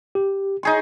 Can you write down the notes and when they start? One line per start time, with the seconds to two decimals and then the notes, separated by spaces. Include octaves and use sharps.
0.15 G4
0.63 D#4 G#4 C#6